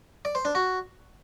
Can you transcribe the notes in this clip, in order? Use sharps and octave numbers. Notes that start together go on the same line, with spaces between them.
D5
C5
D4
F#4